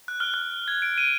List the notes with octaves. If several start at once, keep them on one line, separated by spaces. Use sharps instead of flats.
F#6
F6
F#6
G#6
D7
D#7